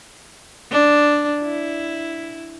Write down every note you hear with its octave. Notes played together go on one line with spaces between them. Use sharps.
D4
E4